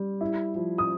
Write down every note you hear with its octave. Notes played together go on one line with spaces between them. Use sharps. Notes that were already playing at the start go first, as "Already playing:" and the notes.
Already playing: G3
E4
F3
D#6